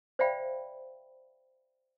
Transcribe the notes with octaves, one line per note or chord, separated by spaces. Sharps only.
C5 D5 E5 F5 G5 B5